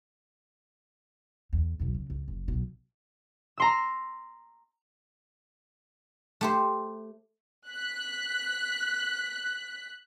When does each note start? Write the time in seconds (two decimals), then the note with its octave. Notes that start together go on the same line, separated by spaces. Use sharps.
1.53 E2
1.80 B1 E2
1.94 C#3
2.10 C#2
2.28 F#1
2.48 B1 B2
3.58 A#5 C6 E6
6.41 A3 G4 C5
7.68 F#6 B6